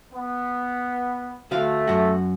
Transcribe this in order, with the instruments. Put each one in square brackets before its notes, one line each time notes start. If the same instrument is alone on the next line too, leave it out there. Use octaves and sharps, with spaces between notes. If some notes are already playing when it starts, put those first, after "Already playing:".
[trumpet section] B3
[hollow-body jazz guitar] D2 F#4 F5 [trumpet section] A3
[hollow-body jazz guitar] F#2 F#4